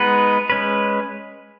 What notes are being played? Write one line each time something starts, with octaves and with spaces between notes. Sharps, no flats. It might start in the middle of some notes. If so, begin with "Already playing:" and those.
Already playing: G#3 B3 D#4 B4
G#3 C#4 B4